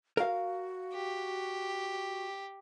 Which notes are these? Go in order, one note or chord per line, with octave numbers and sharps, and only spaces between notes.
F#4 A#4 F5
G4